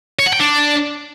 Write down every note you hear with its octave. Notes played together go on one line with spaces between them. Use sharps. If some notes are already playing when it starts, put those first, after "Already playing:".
C#5
F#5
G5
D4